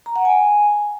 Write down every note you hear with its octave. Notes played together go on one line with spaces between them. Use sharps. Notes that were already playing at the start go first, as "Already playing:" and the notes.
A#5
F#5
G#5